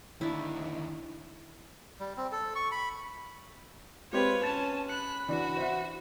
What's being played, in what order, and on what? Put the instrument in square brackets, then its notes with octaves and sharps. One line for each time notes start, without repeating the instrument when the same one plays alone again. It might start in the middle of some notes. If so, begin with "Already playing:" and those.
[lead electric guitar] D2 D#3 [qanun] D4 E4
[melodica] G3
C4
A4
C#6
B5
[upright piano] G#3 C4 G4 [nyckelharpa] F4 B4 [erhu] C#5
[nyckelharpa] C#4 [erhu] A5 [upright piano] A6
[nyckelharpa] B5 [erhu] F#6 [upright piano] C#7
[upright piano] E3 D4 D5 [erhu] F#4
[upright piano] C5 E5 F#5